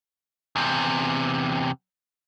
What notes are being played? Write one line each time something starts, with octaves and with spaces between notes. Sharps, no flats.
E2 C3